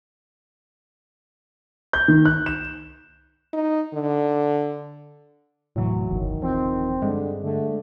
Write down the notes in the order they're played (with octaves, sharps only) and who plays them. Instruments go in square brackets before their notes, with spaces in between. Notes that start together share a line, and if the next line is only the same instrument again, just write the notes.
[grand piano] G6
D#3
F#6
E7
[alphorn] D#4
D3
[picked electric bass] D#1 C3 E3 [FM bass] A2 [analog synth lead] F#3
[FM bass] G1 [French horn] D#3
[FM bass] F3 [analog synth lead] C4
[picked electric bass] G2 [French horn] D3 [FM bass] G#3
[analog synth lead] D3 [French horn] A3